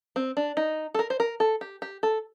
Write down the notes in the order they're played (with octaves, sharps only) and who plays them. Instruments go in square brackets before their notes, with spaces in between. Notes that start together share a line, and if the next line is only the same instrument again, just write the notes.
[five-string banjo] C4
D4
D#4
A4
A#4
C5
A#4
A4
G4
G4
A4